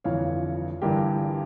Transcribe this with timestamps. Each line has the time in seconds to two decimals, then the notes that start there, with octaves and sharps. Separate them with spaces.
0.04 G1 F2 E3 C#5 F5
0.82 G1 G2 E3 G4 A#4